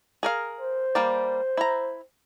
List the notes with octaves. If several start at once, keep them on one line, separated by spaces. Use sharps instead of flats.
G#4 A#4 F5
C5
G3 A#3 D5
E4 A#5